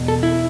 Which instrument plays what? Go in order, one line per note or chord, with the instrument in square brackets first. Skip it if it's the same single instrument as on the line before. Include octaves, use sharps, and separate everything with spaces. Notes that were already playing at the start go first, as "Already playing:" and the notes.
Already playing: [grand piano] E1 E2 B2
[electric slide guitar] A4
E4